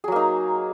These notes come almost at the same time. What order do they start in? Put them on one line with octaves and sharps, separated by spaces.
G#4 F#3 A#3 D#4